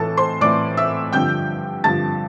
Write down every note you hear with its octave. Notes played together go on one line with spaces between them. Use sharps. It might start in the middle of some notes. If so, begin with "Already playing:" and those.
Already playing: A2 E3 A4 A5
C5 C6
A2 E3 D5 D6
E5 E6
G2 D3 F3 G5 G6
G2 D3 F3 A5 A6